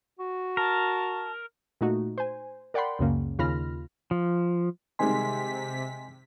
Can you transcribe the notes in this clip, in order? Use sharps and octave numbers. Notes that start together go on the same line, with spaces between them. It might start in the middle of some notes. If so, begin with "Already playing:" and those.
F#4
A#4 A5
A#2 A3 D#4 F#4
C5 G#5
A#4 D5 F#5 G5 B5 C6
C#2 F#2 C#3 A#3
D#2 C#3 F4 B5 F6 A#6
F3
C3 D#3 G3 G#3 D#5 G#5 C6 B6